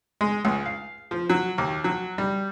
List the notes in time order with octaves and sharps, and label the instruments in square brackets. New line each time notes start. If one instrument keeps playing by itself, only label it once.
[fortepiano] G#3
C#2
F5
F3
F#3
D#2
F#3
G3